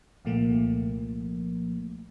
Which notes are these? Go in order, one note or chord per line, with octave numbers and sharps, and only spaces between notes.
C2 A#2 F3 A3 A#3